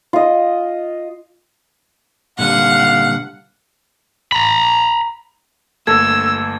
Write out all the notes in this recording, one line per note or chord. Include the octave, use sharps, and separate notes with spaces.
F4 D#5
A#2 D3 G3 F5 F#5
A#5 B5
G1 A3 A#3 A4 E6 G#6